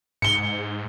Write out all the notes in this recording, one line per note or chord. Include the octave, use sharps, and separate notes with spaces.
G#2 C#7 G7